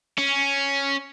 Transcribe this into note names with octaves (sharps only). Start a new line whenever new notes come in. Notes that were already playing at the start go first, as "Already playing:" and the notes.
C#4